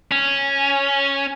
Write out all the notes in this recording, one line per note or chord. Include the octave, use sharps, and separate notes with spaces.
C#4